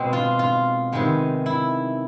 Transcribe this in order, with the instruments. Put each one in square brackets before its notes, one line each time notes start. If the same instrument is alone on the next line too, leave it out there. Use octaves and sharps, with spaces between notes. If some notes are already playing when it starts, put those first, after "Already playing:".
Already playing: [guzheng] B2 G#3 C4
F4
F4
C3 D#3 G#3 B3
E4